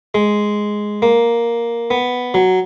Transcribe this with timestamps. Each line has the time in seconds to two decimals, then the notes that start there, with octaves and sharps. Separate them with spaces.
0.14 G#3
1.02 A#3
1.91 B3
2.34 F#3